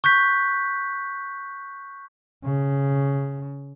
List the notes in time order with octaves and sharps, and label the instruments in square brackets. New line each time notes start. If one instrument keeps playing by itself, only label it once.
[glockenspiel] C#6 F#6 G6 B6
[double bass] C#3